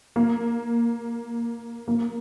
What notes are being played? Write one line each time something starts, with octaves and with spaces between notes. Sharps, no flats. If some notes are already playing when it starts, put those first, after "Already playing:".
A#3
A#3